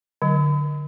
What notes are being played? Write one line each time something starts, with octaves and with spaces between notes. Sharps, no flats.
D3 F#3